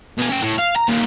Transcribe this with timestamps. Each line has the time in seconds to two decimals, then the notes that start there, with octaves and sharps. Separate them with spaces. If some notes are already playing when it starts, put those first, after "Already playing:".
0.18 B2 G#5
0.29 C#4 G5
0.42 A2
0.59 F5
0.76 A#5
0.88 D#2 A#2